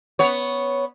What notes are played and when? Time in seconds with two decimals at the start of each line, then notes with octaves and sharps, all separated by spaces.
0.19 B3 C#5